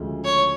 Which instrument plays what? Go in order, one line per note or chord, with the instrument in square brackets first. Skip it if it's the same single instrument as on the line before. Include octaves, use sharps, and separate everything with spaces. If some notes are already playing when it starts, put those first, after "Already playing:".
Already playing: [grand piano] D2 C#3 F3 G#3
[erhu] C#5